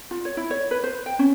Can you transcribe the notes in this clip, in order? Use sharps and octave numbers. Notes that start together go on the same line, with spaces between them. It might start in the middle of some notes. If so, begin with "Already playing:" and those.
F4
C#5
E4
C#5
B4
C5
G5
C#4